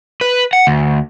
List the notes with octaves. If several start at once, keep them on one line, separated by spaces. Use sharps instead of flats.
B4
F#5
D2